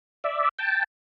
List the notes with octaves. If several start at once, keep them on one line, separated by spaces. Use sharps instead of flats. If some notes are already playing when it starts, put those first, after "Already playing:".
D5 E5
G5 A5